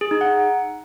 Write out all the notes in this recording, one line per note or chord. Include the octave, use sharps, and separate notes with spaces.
G#4
D#4
F#5